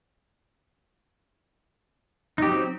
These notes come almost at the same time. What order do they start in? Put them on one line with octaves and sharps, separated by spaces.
D#4 G4 F#3 C4